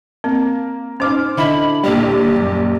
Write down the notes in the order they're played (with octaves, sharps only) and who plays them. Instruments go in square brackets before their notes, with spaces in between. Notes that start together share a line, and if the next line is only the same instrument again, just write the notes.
[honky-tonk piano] A#3 [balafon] C4
[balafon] C#4 D#4 [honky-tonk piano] C5 D6 F6
[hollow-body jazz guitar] D3 E4 [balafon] D#5 E5 [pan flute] B5
[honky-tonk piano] A#1 D#2 G3 [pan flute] G4
[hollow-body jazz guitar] F#2